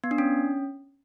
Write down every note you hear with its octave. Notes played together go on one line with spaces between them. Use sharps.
B3
D4
C#4